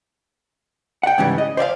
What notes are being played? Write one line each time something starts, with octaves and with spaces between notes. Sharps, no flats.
F#5 G5
G#2 C#3 E3 G3
D#5
C5 D5 E5 F5